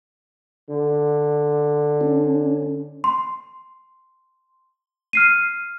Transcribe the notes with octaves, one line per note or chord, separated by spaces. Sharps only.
D3
C#4 D4
C6
F6 C7 D#7